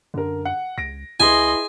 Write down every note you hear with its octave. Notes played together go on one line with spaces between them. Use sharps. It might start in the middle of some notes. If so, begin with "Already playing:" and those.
F#2 D3 A#4
F#5
C#2 A#6 D7
C#2 E4 G#4 B4 D#5 G#5 C6